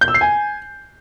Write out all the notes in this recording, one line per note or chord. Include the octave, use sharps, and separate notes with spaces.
G6
E6
C7
G#5